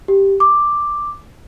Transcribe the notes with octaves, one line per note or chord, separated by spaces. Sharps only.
G4
D6